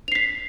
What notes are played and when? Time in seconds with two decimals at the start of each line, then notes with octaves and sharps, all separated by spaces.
0.08 F7
0.12 C7
0.15 B6